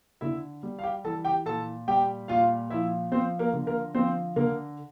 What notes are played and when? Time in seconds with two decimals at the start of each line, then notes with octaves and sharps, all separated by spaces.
0.21 D3 E4 E5
0.63 G3
0.79 F5
0.83 G4 G5
1.04 E3 A4 A5
1.25 G4 G5
1.46 A#2 A4 A5
1.88 G3 G4 G5
2.28 A#2 F4 F5
2.70 F3 E4 E5
3.12 F3 C4 C5
3.39 A#3 A#4
3.53 D3
3.67 A#3 A#4
3.95 F3 C4 C5
4.36 D3 A#3 A#4